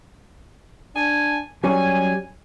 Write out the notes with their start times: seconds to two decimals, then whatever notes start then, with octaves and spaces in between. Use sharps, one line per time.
0.96 D4 G#5 A5
1.64 F#3 G3 C#4 G#5